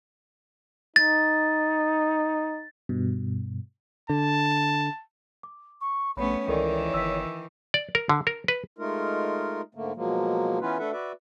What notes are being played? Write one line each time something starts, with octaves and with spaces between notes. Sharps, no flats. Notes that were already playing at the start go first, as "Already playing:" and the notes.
D#4 A6
G2 B2
D3 A5
D6
C#6
A#1 A3 B3 C#4 C#5 B5
C#2 D#3 E3 A4 A#4 D5
G1 E6 B6
D5
A#4
D3
A#4
B4
G#3 A3 D#4 F4 A#4
G#2 D3 A3 A#3
B2 F3 F#3 G#3 A#3
E3 B3 C#4 E4 F4 B4
A3 D4 A4 B4 E5 F#5
F#4 B4 D5 E5